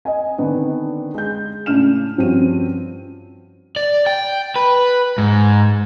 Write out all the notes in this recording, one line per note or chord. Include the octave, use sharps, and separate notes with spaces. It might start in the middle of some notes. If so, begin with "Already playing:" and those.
D#5 G#5
D3 D#3 B3 C4 D4
G#3 G6
A2 C#3 D4 F6 E7
G2 F3 C4 C#4 F#4 D#7
D5
G5
B4
G#2